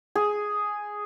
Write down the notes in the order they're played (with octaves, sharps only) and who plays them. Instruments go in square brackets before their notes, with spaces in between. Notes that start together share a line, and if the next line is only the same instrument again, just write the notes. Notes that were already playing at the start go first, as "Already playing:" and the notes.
[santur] G#4